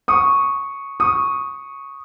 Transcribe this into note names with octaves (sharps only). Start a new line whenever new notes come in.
C#6 D#6
C#6 D#6